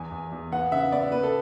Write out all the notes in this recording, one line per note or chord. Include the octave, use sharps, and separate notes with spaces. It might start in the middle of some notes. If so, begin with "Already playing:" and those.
Already playing: E2 G#5
E2
E2
B3 F#5
C#3 E5
B3 D5
B3 B4
A4